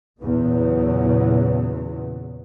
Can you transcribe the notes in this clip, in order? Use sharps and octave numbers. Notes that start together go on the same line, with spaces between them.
E2 A#2 C#3 F#3 B3